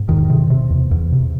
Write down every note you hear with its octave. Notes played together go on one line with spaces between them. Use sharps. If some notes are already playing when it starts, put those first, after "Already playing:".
Already playing: G#2
E2 D#3
C3
C3
E2
E2
C3